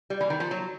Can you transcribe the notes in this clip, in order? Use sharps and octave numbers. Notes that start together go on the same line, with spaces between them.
G3
E3
D#3
F3
F#3